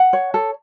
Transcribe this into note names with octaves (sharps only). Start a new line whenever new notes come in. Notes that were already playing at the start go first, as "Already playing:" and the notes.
Already playing: F#5
C#5
A4